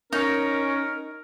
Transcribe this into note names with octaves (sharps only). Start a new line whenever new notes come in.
C#4 D#4 A#4